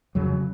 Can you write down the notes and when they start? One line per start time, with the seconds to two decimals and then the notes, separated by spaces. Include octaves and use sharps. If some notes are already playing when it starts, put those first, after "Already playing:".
0.15 F2 C#3 F#3